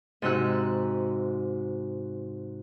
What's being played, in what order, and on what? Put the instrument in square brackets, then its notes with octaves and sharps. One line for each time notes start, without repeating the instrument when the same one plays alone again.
[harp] G#2 C3 D#4 F#4 E6 F#6